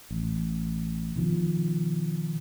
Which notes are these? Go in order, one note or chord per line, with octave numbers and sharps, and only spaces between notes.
A1
B2 D#3 F3